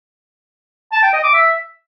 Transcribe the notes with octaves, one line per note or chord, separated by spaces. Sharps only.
A5
G5
D#5
D6
E5